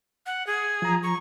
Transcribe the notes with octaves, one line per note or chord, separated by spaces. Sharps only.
F#5
G#4
F3 A#5
C#6